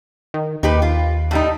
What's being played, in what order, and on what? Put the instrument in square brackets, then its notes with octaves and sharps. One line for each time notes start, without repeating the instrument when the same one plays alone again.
[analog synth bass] D#3
[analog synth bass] D#2 [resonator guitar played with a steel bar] D#4 G4 B4
[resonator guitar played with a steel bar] F4
A2 G3 D#4